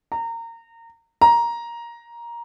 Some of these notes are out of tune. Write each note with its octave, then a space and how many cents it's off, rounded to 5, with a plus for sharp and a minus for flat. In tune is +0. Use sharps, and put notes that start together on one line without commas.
A#5 -25
A#5 +10